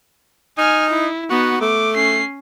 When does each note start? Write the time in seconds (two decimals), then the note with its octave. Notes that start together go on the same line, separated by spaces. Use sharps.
0.58 D#4 G#5 F6
0.90 E4
1.30 B3 D#4 F#4
1.61 A3 D6
1.96 C#4 C7